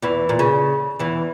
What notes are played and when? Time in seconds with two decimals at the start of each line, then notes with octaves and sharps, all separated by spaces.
0.02 E2 E3
0.29 A#2
0.39 C#3
0.99 E2 E3